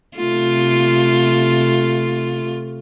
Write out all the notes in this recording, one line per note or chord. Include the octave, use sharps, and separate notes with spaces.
C3 A3 F4